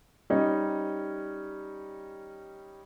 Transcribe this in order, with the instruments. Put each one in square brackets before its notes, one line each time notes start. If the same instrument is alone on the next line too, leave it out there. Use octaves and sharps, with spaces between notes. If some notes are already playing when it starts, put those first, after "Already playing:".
[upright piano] G3 C#4 D#4